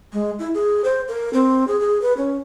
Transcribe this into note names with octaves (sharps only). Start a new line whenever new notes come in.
G#3
E4
G#4
C5
A#4
C4
G#4
G#4
B4
C#4